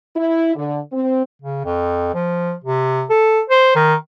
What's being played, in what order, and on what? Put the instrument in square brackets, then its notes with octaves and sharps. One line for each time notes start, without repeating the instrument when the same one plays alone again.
[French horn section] E4
D3
C4
[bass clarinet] C#3
F2
F3
C3
A4
C5
D#3